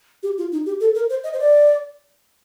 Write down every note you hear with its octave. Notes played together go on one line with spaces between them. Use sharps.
G4
F4
D#4
G4
A4
A#4
C5
D#5
C5
D5